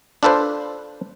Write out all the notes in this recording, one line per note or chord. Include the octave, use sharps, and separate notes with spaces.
D4 F4 A4 B4 C5